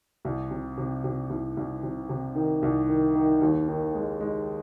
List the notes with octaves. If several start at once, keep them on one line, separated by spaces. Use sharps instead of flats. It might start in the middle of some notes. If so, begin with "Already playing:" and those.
C2
C3
C3
C3
C2
C2
C3
C3
D#3
C2
D#3
D#3
D#2
D#3
G#3
G#3